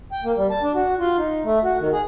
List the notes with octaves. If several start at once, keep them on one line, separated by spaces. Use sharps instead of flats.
G5
A#3
G3
A5
D4
F#4
F4
D#4
A3
F#4
D#3
G#4